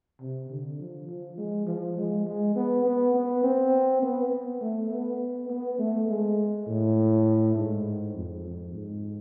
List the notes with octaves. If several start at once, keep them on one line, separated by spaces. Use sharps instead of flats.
C3
D3
F3
F3
G#3
F3
G#3
G#3
B3
B3
B3
C4
B3
B3
A3
B3
B3
A3
G#3
A2
G#2
F2
F2
G#2